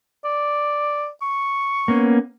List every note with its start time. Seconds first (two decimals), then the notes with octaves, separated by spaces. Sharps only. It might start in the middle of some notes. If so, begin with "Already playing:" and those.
0.25 D5
1.22 C#6
1.88 A#3 B3 C#4